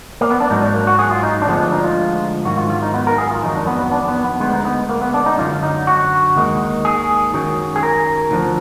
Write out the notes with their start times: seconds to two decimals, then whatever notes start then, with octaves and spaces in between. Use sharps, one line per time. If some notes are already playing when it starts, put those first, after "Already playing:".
0.21 A#3
0.30 B3
0.40 D4
0.50 G#2 F#3 D#4
0.62 D4
0.74 A#3
0.87 F#4
0.99 G#4
1.11 F4
1.23 D#4
1.42 D4
1.47 D2 D3 F3 G#3 B3
1.60 D4
1.72 D#4
1.84 F4
2.45 G#2 D#3 F#3 F#4
2.58 F4
2.70 F4
2.82 D#4
2.94 B3
3.07 A#4
3.18 G#4
3.31 F4
3.43 F2 D#3 F#3 D#4
3.55 D4
3.67 B3
3.79 B3
3.92 D4
4.08 B3
4.24 B3
4.40 D2 D3 G#3 B3
4.53 D#4
4.65 B3
4.89 A#3
5.02 B3
5.14 D4
5.26 D#4
5.38 F#2 D3 F#3 F4
5.63 D#4
5.87 F#4
6.36 D#2 D#3 G#3
6.85 G#4
7.34 F#2 D#3 F#3
7.76 G#4
7.83 A#4
8.31 D2 D3 F3